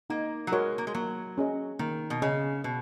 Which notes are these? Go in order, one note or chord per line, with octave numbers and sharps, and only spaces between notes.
A#3 D#4
F#3
G#3 F#4 A#4 C#5 F#5
A#3
G#3
F#3 A#3
C#4 G#4 D#5
D#3 A#3
B2
C#3 C#4 G#4 D#5
B2 B3